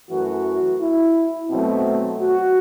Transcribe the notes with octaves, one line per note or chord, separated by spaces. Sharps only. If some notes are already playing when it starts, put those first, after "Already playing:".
F#2 E3 A3 F#4
E4
B2 F#3 A3 C4
F#4